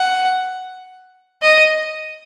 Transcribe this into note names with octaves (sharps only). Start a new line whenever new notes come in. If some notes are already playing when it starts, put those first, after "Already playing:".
Already playing: F#5
D#5